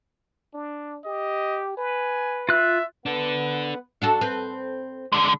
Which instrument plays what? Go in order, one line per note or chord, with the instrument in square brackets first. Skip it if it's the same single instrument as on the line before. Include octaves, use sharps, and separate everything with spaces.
[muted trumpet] D4
[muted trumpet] G4 [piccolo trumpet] D#5
[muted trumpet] B4 [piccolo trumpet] G#5
[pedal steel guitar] F4 F#6 [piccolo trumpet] E5
[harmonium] B3 B4 F#5 [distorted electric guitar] D4 A4
[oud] D4 F#4 A4
C4 B4
[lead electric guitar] D3 G#3